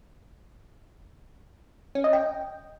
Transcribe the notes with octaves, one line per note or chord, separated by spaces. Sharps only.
C#4
D#5
G5